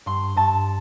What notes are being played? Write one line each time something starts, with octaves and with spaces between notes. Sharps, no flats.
G2 C6
G2 A5